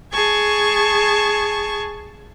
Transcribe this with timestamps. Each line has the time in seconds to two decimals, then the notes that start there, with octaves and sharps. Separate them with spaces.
0.13 G#4 A5 C#6 G#6